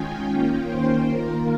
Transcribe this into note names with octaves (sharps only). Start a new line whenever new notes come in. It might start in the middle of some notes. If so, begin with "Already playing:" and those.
Already playing: D#3 G#3 C#4 F4 G5 G#5
D#3 A#3 C#4 F4
C5
D#3 A#3 F4 A#4